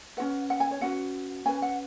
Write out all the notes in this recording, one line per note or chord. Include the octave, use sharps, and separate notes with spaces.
C#4 F#4 B4 F#5
F#5
G#5
C#5
C#4 F#4 B4 F#5
C#4 B4 G#5
F#5